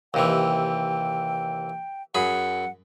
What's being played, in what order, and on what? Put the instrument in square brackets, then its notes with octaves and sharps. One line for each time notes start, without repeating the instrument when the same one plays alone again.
[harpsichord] D#2 C3 E3 [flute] G5
[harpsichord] F#2 G#4 B5 [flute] F#5